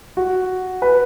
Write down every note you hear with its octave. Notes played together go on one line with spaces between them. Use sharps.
F#4
B4